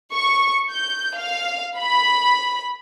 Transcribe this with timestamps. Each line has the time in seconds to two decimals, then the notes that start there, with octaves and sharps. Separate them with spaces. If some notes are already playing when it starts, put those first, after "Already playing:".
0.13 C#6
0.71 G6
1.16 F5
1.77 B5